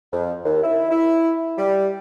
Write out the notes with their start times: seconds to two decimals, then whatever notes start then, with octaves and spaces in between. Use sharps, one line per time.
0.12 F2
0.44 D#2
0.63 E4
0.91 E4
1.58 G3